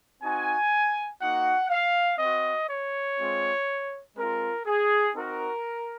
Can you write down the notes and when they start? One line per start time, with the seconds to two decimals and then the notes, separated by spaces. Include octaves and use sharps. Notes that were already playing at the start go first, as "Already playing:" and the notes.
0.22 C4 D#4 F#4 G#5
1.20 A#3 D#4 F#4 F#5
1.70 F5
2.19 C4 F#4 D#5
2.69 C#5
3.18 G#3 C4 F4
4.17 G#3 C4 F4 A#4
4.66 G#4
5.15 C4 D#4 F#4 A#4